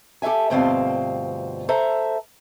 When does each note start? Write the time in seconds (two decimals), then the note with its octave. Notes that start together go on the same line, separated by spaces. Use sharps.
0.22 G4 A4 B4 E5 G#5
0.50 D2 G2 B2 C4 F4 F5
1.69 A4 C5 E5 A#5